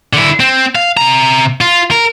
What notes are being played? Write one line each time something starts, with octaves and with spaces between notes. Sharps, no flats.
D3 E4
C4
F5
C3 A#5
F4
A#4